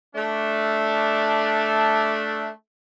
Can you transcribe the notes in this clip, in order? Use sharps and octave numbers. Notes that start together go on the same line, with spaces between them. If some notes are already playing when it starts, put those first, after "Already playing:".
A3 D4